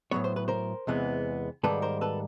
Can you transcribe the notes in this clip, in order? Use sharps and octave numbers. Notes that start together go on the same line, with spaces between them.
A2 F#3 B3 C#5
C5
B4
A#4 C5
E2 C3 E3 G#3 B3
G#2 D#3 G3 A#3 A4 B4
A#4 C5
A4 B4